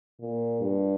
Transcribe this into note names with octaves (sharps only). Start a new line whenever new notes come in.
A#2
G2